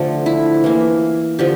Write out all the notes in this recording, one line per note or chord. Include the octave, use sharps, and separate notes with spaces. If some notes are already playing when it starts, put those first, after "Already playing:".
Already playing: D3 F3 A3
E4
E3 A#3
D3 F3 G4